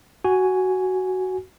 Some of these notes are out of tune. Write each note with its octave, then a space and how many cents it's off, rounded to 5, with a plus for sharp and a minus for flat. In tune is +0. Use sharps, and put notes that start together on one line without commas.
F#4 +10 G#5 +0